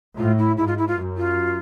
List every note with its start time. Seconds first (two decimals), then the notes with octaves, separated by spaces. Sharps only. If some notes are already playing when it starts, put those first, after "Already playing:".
0.17 A2 F4
0.38 E4
0.57 G#2 E4
0.67 F4
0.77 E4
0.87 F4
0.97 F#2
1.17 F4